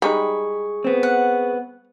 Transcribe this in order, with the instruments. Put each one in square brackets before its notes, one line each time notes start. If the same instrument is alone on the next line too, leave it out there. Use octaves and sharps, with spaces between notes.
[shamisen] G3 G#3 D#4 [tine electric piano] G#4 C#6 [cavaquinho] B5
[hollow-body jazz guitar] B3 C4
[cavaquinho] F#5